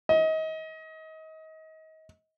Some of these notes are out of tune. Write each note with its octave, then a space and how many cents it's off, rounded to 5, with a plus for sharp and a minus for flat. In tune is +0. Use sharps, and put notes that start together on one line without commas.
D#5 +30